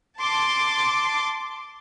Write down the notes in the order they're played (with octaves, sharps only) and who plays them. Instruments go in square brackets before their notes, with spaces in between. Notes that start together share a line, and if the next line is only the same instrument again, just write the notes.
[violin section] A5 C6 D6